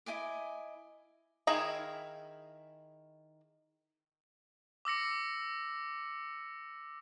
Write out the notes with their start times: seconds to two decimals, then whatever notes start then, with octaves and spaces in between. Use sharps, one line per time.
0.06 E4 D#5 G#5 D6
1.47 D#3 E4 G#4 F5 A#5
4.85 D6 E6 A#6 C#7